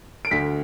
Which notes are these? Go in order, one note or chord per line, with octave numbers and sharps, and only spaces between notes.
D7
D2 B6